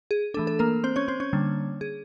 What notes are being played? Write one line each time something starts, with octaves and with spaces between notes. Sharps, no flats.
G#4
E3 A3 D4 A4
A4
A#3 A#4
C4 C5
C#4 C#5
C4 C5
C#4 C#5
D3 G3 A#3 D4
G#4